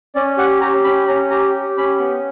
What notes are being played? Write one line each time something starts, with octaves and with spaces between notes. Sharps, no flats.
C#4 D5
G4 F#5
G4 A#5
C#4 B5
C#4 A#5
G4 A#5
G4
C#4 B5
B3